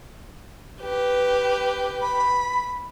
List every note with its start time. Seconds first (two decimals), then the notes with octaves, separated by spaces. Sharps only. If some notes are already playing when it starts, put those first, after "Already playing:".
0.81 G4 B4
2.02 B5